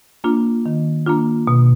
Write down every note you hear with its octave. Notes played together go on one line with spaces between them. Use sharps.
A#3 D4 F4
D#3
A#3 D4 F4
B2